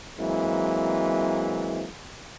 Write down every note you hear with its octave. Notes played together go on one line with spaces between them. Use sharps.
E3 F#3 G#3 A#3 C4 E4